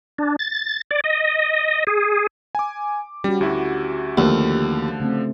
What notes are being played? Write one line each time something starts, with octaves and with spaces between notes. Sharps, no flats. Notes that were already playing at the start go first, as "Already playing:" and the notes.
D4
A6
D5
D#5
G#4
G#5 D6
G3 C#4 F#4
D2 E4 F#4 G4
D#2 D3 F3 A3
C#3 A3 C4